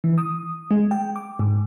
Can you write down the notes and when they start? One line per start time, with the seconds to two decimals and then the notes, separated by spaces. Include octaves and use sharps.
0.04 E3
0.18 D#6
0.71 G#3
0.91 G5
1.16 D6
1.39 G#2